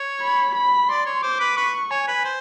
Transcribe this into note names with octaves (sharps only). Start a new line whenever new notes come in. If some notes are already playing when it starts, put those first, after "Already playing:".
Already playing: C#5
B5
B5
D5 C6
C#5
C5 D6
B4
B4 C#6
C#5 G#5
B4
C5